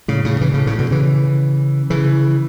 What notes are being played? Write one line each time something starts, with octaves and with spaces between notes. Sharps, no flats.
A2 C#3
A2 C#3
C#3 E3
A2 C#3
A2 C#3
B2 D3
C#3 E3
C#3 E3